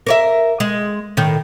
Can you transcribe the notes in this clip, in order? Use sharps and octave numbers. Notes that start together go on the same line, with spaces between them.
A#4 C#5 E5
G#3
A2 D#3